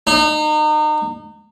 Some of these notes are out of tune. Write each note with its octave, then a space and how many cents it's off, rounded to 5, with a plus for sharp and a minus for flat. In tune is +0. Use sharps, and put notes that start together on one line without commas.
D#4 -35